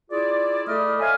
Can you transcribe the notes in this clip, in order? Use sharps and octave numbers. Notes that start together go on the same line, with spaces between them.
E4 F4 G#4 D5
A3 A4 D5 D#5 B5 F6
C5 C#5 E5 F5 G#5